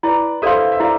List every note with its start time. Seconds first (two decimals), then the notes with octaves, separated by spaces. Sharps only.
0.03 E4 B4 D5
0.42 A4 C5 D5 E5 F5 C6
0.72 E5
0.80 E4 D5 F5